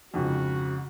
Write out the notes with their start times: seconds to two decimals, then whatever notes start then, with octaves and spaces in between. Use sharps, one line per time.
0.14 F2 G#2 C#3 F#4